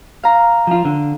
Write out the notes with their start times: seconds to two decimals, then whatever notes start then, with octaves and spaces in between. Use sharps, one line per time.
0.23 F5 A#5
0.67 F3 F4
0.85 D3